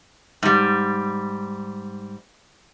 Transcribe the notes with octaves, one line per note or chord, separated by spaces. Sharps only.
G#2 G3